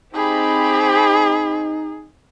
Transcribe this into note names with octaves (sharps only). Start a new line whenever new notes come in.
C4 D#4 G4 G#4 B5